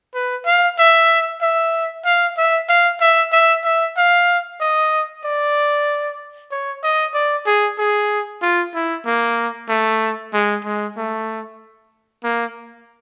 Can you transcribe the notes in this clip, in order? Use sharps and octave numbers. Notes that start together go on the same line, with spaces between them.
B4
F5
E5
E5
F5
E5
F5
E5
E5
E5
F5
D#5
D5
C#5
D#5
D5
G#4
G#4
F4
E4
A#3
A3
G#3
G#3
A3
A#3